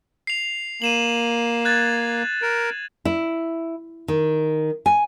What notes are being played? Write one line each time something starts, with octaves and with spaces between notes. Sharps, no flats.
C7 F7
A#3 D#7 E7 F#7
F#6 G#6 A6
A#4
E4
D#3
G#5